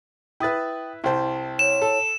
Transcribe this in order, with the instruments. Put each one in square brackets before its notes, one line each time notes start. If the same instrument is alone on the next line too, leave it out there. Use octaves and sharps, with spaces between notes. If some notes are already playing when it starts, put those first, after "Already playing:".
[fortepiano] E4 B4 [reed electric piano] G5 D#6 A6
[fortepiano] C2 C5 [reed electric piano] E4 G5 A5
[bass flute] C#5 [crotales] E7
[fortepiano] A4